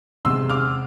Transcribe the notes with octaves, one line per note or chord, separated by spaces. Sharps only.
E2 C3 G#3 C6 E6
D6 F6